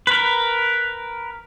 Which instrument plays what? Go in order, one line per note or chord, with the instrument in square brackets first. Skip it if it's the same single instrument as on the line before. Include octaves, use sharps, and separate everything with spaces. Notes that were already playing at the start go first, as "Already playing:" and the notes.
[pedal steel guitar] A#4 B4